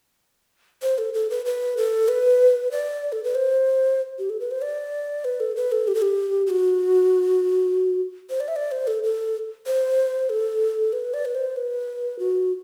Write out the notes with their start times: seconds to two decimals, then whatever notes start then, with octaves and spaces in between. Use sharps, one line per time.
0.83 C5
0.98 A4
1.14 A4
1.30 B4
1.46 B4
1.77 A4
2.08 B4
2.71 D5
3.12 A4
3.24 B4
3.35 C5
4.19 G4
4.30 A4
4.40 B4
4.51 C5
4.62 D5
5.25 B4
5.40 A4
5.56 B4
5.72 A4
5.88 G4
5.95 A4
6.02 G4
6.47 G4
6.50 F#4
8.30 C5
8.40 D5
8.48 E5
8.56 D5
8.72 C5
8.87 A4
9.03 A4
9.67 C5
10.30 A4
10.93 B4
11.14 D5
11.25 B4
11.35 C5
11.56 B4
12.19 F#4